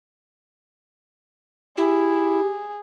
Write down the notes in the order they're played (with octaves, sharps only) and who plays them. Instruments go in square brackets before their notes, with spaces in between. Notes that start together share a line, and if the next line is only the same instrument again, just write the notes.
[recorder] E4 [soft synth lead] G4 [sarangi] G#4